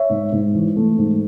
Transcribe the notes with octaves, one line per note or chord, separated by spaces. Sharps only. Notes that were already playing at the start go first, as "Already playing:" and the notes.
Already playing: C#5 E5
G#2
G#2
E3
A3
G#2